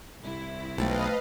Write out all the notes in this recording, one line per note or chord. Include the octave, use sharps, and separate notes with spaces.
C2 E4
B1 F2 A3 B4 D#5 F5 G5